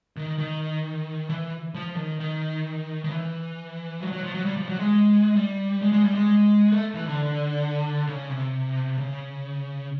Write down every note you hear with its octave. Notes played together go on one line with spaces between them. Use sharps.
D#3
D#3
E3
F3
D#3
D#3
D#3
E3
F#3
F#3
F3
F#3
G3
F3
F#3
G#3
G3
G#3
G#3
G3
G#3
A3
E3
D3
C#3
C3
C#3